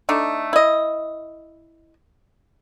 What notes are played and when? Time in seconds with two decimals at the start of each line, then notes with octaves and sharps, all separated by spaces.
0.09 A3 D4 D#4
0.53 E4 D#5